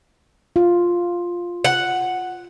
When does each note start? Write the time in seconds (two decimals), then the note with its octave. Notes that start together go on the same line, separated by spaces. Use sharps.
0.56 F4
1.64 F#5